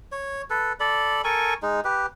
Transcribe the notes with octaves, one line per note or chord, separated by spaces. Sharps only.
C#5
A4 B4
A4 D5 B5
A4 A#4 G#5 C#6
G#3 D#4
G4 B4